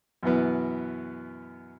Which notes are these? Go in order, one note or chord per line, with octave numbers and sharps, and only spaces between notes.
F#2 B2 E3 B3